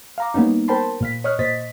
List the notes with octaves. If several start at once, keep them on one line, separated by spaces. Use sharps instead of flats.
F5 A#5 D6
G3 A#3 B3 C#4 D#4
A#4 C5 G5 A5 B5 C6
A#2 F5 B6
C#5 D#5 C#6 F6 F#6 C7
A#2 C5 D#5 A6 B6